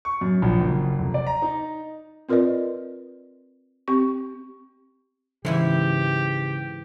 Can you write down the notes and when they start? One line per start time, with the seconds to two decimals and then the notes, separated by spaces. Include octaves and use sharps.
0.05 C#6
0.21 F#2
0.42 A#1
0.60 F#1
0.99 F1
1.14 D5
1.27 A#5
1.42 D#4
2.29 C4 F4 A#4 B4 D5 D#5
3.88 C4 G4 C#6
5.45 G#2 C#3 E3 E4 G4